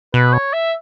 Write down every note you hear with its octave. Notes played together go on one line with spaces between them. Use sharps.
B2 B4
C#5
E5